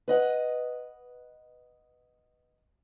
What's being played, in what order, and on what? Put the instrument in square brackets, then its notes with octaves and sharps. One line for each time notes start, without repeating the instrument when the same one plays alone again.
[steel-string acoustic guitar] B4 D#5 F#5